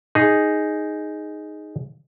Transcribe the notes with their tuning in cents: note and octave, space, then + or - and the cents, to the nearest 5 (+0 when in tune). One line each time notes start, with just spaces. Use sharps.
D#4 +0 G#4 +0